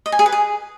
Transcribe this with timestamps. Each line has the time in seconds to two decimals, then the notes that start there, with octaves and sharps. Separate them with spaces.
0.06 D#5
0.12 G#5
0.19 G#4
0.26 B4
0.32 G#4